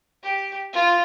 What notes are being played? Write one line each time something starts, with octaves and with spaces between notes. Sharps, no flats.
G4
F4